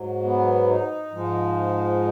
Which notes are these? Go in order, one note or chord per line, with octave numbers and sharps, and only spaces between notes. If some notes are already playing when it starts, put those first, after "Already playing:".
Already playing: G#2 F#3
B3
D#4
G#2 F3 G#3